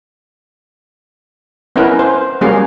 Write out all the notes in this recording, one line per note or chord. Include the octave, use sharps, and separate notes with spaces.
B3 C#4 E4 A#4 B4
C5
G3 A#3 C#4 F#4 G#4 F5